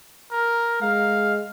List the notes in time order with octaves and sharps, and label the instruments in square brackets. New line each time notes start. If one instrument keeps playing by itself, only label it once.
[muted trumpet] A#4
[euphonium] G#3 [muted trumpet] F5